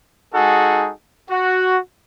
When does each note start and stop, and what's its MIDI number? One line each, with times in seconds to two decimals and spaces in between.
0.34 0.92 56
0.34 0.92 63
0.34 0.92 66
0.34 0.92 68
0.34 0.92 69
1.30 1.79 66